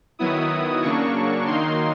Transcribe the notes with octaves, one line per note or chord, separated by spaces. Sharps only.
D#3 F#3 B3 E4 D#6
C#3 F#3 A#3 D4 C#6
D#3 F#3 A#3 D#4 C6